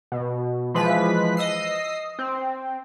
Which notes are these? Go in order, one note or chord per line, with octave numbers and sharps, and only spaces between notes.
B2
E3 F3 G#3 B4 B6
D#5 D#6 E6 C7
C4